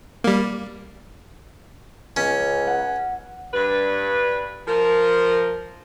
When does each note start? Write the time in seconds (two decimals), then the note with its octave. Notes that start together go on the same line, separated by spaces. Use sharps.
0.24 G3 A#3
2.17 C#2 C#4
2.67 F#5
3.54 G2 B4
4.67 F3 A#4